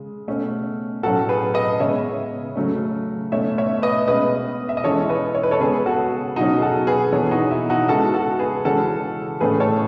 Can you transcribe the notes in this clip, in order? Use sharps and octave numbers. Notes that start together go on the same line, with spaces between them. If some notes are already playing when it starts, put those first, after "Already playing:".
Already playing: C#3 G#3
B2 A3 C#4
A2 F#3 C#4 F#4 A4
G#4 B4
B4 D#5
C#3 G#3 B3 C#5 E5
C#3 F#3 A3 C#4
B2 A3 C#4 C#5 E5
C#5 E5
B4 D#5
B2 G#3 C#4 B4 D#5
E5
D#5
E3 G#3 C#4 A4 C#5
B4 D#5
C#5
B4
A4 C#5
C#3 G#3 B3 G#4 B4
F#4 A4
B2 F#3 C#4 D#4 F#4
G#4
F#4 A4
G#4 B4
E3 B3 A4 C#5
D#4 F#4
E4
D#4 F#4
C#3 G#3 B3 F#4 A4
F#4 A4
G#4 B4
C#3 E3 G#3 C#4 F#4 A4
A2 E3 A3 C#4 G#4 B4
A4 C#5